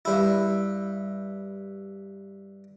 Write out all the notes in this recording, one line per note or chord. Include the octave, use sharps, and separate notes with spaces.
G2 E4